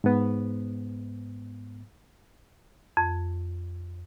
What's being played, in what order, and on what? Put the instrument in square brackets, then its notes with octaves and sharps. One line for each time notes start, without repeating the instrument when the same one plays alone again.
[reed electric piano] G#2 B3
[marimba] F2